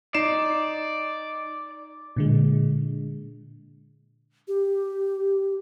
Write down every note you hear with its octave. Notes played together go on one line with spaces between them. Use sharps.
D#4 D5 C7 E7
A#2 D3 G#3
G4